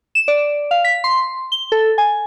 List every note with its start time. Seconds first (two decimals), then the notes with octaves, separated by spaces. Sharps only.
0.15 E7
0.28 D5
0.71 F5
0.84 B6
1.04 C6
1.52 G7
1.72 A4
1.98 G#5